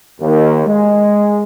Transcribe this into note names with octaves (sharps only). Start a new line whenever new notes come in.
D#2
G#3